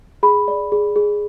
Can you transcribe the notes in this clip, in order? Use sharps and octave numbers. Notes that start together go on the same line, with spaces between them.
G#4 B5
D5
G#4
G#4